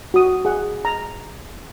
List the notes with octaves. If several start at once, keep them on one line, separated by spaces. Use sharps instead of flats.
F#4 D#6
G#4 F#5
A#5